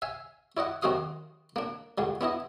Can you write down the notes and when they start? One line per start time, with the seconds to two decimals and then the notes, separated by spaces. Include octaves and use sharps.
0.02 E5 F5 G#5
0.57 E4 D5 D#5 F#5
0.82 F#2 D#3 C4 F#4 F5 D#6
1.56 A#3 D4
1.98 C#2 G2 D3
2.21 B3 D4 E4 D#5